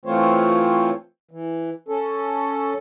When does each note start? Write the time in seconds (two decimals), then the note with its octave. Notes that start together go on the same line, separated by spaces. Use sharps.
0.06 E3 A3 C4 F4 C5 C#5
1.31 E3
1.89 C#4 A4